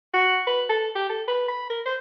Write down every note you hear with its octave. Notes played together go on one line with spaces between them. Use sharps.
F#4
B4
A4
G4
A4
B4
B5
A#4
C5